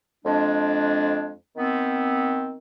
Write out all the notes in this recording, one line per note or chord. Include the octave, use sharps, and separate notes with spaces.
F2 G#3 D4
D#3 B3 C4